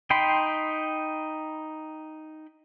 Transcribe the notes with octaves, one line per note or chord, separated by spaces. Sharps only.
D#4 G5 B5 C6